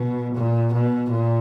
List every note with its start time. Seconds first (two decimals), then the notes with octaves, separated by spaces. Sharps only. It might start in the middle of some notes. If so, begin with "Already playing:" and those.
Already playing: B2
0.35 A#2
0.73 B2
1.10 A#2